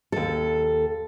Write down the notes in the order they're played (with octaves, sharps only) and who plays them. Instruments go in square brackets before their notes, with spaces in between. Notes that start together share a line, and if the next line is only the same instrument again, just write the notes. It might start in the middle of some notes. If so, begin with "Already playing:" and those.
[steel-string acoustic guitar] D#2 A4